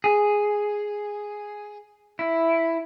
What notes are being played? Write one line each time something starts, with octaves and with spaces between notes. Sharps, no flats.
G#4
E4